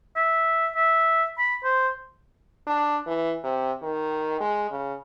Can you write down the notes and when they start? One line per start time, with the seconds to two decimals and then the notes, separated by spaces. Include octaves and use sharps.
0.16 E5
0.76 E5
1.38 B5
1.64 C5
2.67 D4
3.07 E3
3.44 C3
3.82 D#3
4.41 G#3
4.71 C#3